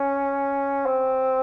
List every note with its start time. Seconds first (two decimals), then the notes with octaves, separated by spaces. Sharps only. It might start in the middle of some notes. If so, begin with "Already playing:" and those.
Already playing: C#4
0.86 C4